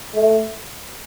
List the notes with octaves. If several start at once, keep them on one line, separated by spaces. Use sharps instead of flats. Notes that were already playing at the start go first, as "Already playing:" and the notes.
A3